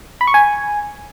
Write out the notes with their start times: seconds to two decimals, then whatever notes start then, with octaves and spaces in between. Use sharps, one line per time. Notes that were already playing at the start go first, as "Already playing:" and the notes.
0.21 B5
0.27 C#6
0.34 G#5